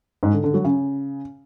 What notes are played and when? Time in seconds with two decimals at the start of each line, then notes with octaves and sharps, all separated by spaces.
0.23 G#2
0.33 D3
0.44 D3
0.54 F#3
0.65 C#3